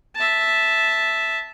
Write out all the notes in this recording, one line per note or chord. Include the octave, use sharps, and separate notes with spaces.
E5 A5